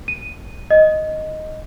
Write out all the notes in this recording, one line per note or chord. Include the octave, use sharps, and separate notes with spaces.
D#7
D#5